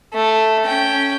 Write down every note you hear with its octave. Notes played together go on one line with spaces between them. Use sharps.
A3
C#4 G5